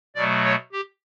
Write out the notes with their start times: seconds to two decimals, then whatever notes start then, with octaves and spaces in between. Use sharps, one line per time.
0.15 B2 F#3 A3 D5
0.44 C#5
0.72 G4